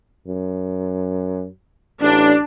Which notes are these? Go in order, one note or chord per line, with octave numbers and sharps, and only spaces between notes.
F#2
A1 D4